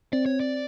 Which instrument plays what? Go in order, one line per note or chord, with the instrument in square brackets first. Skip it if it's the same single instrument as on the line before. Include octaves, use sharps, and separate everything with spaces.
[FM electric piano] C4 [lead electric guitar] D5
[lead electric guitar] C#5
D5